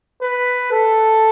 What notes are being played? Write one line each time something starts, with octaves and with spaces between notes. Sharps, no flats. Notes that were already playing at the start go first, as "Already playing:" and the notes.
B4
A4